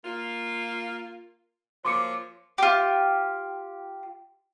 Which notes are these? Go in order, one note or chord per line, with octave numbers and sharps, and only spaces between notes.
A#3 F4
F3 F#3 A#3 C6 D6 C#7
F4 G4